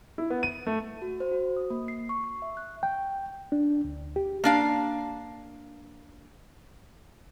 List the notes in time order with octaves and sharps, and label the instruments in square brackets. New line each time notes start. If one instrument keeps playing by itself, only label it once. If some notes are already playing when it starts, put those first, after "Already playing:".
[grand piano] E4
B3
D#7
A3
[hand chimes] F#4
C5
F#4
D#6
A#3
C7
C#6
C#6
E5
F#6
[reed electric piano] G5
D4
D2
G4
[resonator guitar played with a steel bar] A#3 D4 F5